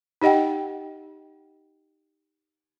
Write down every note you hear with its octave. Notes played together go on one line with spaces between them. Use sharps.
D#4 G4 D#5 F#5 G5